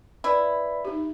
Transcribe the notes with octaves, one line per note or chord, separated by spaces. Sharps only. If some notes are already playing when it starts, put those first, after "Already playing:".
E4 B4 D5 B5
D#4 G4